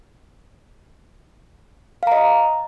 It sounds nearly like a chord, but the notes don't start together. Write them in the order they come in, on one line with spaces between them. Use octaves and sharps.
F5 A#5 D#5